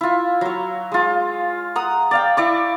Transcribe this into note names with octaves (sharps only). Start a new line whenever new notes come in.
E4 F4
F#3 C#5
G#3 F4
F#5 A#5 D#6
D5 F5 G5
E4 D5 C#6